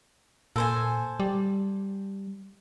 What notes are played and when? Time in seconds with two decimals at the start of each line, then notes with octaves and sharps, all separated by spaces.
0.56 A#2 A4 C5 G#5
1.20 G3